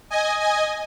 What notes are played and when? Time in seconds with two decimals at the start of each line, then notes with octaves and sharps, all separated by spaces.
0.10 D#5 G#5
0.40 D#5 G#5